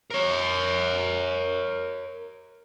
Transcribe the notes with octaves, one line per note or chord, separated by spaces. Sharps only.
A#4 C#5